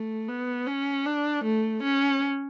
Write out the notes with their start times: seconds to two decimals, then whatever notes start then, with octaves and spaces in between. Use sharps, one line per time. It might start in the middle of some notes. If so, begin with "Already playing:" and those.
Already playing: A3
0.28 B3
0.67 C#4
1.05 D4
1.44 A3
1.83 C#4